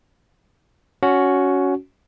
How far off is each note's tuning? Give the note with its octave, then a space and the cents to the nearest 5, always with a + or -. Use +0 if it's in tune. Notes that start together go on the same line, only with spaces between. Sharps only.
C#4 +15 F#4 +0